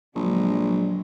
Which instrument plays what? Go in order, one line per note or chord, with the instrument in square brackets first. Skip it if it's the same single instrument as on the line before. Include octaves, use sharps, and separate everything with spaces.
[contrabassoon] A#1 [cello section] D3 F#3 G#3